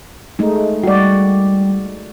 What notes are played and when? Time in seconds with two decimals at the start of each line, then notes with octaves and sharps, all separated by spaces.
0.39 G#3 A3 D#4
0.83 G3 F#4 D5